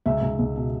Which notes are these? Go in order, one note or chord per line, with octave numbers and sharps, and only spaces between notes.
C#2 E5
C#2
C#2
B2